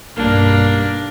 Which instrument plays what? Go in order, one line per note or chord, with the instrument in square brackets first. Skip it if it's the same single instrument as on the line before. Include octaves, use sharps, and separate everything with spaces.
[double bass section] B1 G2 G3 [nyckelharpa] A#3 D4